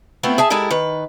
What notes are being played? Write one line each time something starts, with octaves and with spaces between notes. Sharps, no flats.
A3 B3 C4 E4 F4
G#4 E5 A5
G#3 E4 G4 A4 A#4
D#3 B4